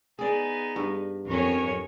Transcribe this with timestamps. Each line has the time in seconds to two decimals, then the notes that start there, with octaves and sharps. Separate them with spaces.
0.19 B3 D#4 G#4 D5
0.76 G2
1.26 F2 C#4 A#4 C#5